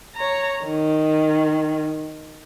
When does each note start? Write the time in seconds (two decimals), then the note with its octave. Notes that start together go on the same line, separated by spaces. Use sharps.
0.16 C#5 A#5
0.65 D#3